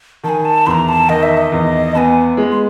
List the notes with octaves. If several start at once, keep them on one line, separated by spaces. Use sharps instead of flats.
D#3 A5
G#5
A5
E2 A#5 C6
A5
D#3 D#5
E5
D#5
E2
B3 G#5 A5
G#3
C6